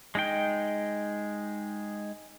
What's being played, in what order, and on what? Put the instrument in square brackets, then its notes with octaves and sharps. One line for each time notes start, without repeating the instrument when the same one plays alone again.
[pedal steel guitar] G#3 D#4 G5